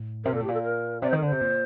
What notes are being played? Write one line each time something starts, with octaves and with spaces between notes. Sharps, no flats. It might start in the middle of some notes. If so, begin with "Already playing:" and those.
Already playing: A2
C3 A#4
A#2 A4
A2
G4
A#2
A4
A#4
C3 D5
D#3 C5
A#4
D3 C5
C3
A#2